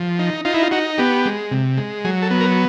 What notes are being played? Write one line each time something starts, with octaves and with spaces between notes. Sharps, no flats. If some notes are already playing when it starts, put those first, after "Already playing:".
Already playing: F3
D#4
D#4 F4
E4
F4
D#4 F#4
B3 G4
G#3
C3
G#3
F#3 G#4
A4
B3
A#4